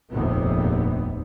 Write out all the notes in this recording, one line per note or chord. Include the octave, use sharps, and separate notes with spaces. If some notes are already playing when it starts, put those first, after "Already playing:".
F1 A#1 D#2 C3 B3